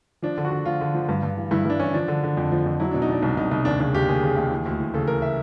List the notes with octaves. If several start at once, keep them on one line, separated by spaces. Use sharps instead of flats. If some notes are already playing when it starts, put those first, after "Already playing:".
F3 D4
D3
F#4
D3
F3 F4
D3
F3
G2
G2
E3
G2 E4
G2 D4
E3 C#4
F3 D4
D3
D3
F2
F3
F2
F#3 E4
D4
B2
D#4
B2 D4
C2 D4
C2 D#4
C2 D#4
D#2 D4
C#3 D4
D#2 G4
D#2 G#4
C#3
D#2
E3
D2
E3
C#3 A4
E3 A#4
E5